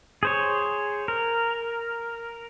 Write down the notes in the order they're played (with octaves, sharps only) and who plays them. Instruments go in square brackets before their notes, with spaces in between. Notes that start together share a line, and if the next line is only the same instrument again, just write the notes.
[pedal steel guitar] G#4 C5 C#5
A#4